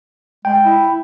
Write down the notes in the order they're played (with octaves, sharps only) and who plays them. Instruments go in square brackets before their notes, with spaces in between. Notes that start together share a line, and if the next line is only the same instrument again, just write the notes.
[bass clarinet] G#3 [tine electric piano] G5
[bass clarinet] E4